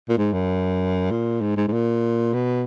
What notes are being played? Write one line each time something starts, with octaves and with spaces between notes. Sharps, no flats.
A#2
G#2
F#2
A#2
G#2
G#2
G#2
A#2
B2